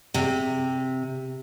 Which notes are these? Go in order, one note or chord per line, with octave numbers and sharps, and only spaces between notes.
C3